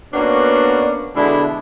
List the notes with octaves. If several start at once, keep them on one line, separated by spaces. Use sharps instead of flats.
A#3 B3 C#4 D4 F#4 D5
B2 D3 G#3 D4 E4